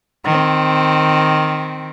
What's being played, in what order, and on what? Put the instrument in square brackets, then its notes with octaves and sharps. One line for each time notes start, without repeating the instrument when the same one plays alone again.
[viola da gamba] D#3 C4